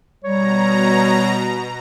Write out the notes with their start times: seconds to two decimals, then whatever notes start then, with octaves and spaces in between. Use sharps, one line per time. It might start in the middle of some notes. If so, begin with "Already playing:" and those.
0.24 B2 G3 C#5 A#5